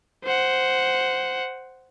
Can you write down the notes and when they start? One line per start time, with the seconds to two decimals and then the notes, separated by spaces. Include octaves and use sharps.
0.24 C5 F#5